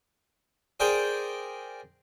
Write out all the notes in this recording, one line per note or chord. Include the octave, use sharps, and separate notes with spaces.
G#4 A#4 C5 D5 G5